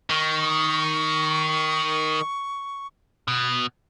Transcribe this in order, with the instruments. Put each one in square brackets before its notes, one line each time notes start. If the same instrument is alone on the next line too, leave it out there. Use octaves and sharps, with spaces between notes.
[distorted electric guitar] D#3 [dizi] C#6
[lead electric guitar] B2